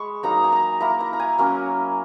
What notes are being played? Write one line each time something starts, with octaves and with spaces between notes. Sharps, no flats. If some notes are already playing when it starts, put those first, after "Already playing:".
Already playing: G#3 B5 C#6
F#3 A#3 D#4 A#5
G#5
A#5
A#3 E4 A#5
A#5
A#5
G#5
F#3 A#3 C#4